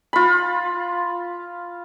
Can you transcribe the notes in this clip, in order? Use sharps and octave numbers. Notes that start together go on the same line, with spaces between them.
F4 B5